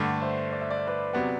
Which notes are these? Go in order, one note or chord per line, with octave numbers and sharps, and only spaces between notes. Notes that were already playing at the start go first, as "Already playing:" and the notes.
Already playing: G2 D3 A3 D4 D5 F#5
C5 E5
D5
E5
D5
E5
B4 D5
C3 F#3 B3 D5 F#5